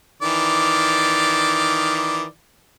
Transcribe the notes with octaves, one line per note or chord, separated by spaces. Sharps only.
D#3 E3 D5